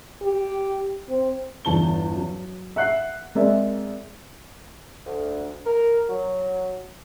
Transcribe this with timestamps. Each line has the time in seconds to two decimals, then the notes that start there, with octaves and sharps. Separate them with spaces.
0.22 G4
1.09 C4
1.65 G1 E2 A5 G7
2.16 F#3
2.76 E5 F#5 F#6 C7
3.35 G#3 C4 A#4 D5 E5
5.06 D2
5.66 A#4
6.09 F#3